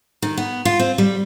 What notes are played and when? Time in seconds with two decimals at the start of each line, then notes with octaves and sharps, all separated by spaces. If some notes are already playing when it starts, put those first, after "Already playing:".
0.22 D#3
0.37 B3
0.65 F4
0.79 C4
0.98 G3